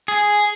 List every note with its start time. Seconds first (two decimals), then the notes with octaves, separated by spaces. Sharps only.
0.08 G#4